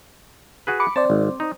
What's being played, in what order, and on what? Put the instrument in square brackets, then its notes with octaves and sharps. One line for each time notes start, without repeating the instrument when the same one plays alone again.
[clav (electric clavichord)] F#4 G#4 B4
[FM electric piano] B5 D6 C#7
[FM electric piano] C4 C5 D5 [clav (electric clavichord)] A5
[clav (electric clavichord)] G#1
D#4